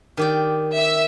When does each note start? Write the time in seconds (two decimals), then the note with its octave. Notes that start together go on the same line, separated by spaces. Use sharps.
0.17 D#3 G4 D5
0.75 E5 E6